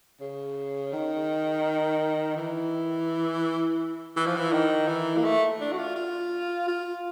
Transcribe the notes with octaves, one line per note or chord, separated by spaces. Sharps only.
C#3
D#3
E3
E3
F3
E3
D#3
E3
A#3
A3
D4
F#4
F4
F4
F4